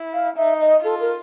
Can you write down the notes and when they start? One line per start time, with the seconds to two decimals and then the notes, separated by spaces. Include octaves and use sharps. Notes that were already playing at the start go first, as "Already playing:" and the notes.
Already playing: E4
0.13 F5
0.37 D#4 E5
0.60 D#5
0.84 F4 A4
1.00 A#4